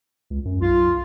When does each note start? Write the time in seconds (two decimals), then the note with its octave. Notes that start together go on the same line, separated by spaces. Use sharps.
0.30 C#2
0.45 F#2
0.61 B1 F4